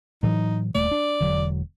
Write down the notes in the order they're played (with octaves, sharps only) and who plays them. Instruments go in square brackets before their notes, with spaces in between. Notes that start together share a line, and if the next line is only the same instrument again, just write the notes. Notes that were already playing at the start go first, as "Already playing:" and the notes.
[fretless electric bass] A2 E3 F#3 [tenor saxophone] D#4
[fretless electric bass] D#1 A3 [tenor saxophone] D5
[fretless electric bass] D4
E1 D3 F#3